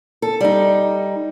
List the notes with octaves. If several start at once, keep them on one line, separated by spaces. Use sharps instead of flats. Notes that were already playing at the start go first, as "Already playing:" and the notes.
A4
G3 D#4